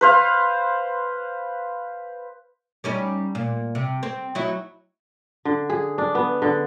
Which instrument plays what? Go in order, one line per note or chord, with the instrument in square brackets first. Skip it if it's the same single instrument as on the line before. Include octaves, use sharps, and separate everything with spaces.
[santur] B4 C5 F5
[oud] G3 C#4 D#4
A#2
C3
C4
F#3 D#4 E4
[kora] D3
G#4
D4
B3
D3